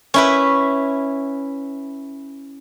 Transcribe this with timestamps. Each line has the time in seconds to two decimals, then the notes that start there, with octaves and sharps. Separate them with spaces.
0.14 C#4 E4 B4